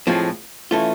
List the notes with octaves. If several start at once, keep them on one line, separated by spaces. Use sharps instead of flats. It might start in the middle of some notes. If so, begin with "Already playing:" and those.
A2 F3 G#3 C4 F4
E3 A3 C#4 F4